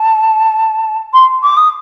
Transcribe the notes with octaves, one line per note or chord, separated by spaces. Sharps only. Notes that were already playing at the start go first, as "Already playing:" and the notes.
Already playing: A5
C6
D6
D#6